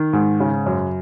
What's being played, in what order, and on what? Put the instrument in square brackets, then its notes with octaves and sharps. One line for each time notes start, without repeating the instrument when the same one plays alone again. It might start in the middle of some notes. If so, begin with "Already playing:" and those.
Already playing: [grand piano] D#3
G#2
C#3
F#2